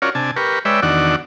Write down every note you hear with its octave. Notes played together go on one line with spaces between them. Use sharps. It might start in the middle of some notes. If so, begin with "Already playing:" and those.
C#4 F4 F#4 A#4 C#5 D5
C3 D4 G#5 A5
G4 A#4 B4 C#6
G#3 B4 C#5 D5 E5 G5
E2 D#3 D4 F#4 D5 F#5